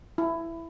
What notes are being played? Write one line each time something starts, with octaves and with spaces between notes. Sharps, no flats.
E4